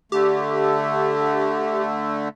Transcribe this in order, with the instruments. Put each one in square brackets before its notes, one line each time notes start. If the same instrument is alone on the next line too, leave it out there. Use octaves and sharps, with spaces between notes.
[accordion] D3 A3 [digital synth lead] G4